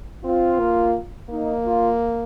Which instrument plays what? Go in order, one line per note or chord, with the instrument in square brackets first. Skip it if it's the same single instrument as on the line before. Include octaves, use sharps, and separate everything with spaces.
[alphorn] C4 [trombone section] F4
[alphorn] A#3
[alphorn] A#3 [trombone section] D#4
[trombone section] F4